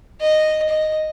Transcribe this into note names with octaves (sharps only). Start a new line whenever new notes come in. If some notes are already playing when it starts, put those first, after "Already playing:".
D#5
D#5